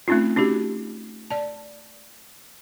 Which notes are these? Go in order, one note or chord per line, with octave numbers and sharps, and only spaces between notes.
A3 C4 C#4 D#4 F4
C#4 D#4 F#4 G4
D5 A5